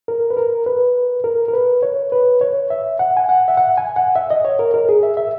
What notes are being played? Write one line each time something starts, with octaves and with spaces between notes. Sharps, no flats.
A#4
B4
A#4
B4
A#4
A#4
B4
C#5
B4
C#5
E5
F#5
G#5
F#5
E5
F#5
G#5
F#5
E5
D#5
C#5
A#4
A#4
G#4
E5
E5